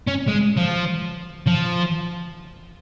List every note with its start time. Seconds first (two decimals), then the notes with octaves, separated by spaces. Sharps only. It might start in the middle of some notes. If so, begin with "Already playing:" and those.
0.08 C#4
0.29 G#3
0.58 F3
1.46 F3